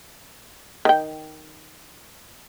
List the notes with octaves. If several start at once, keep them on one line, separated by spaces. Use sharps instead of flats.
D#3 G5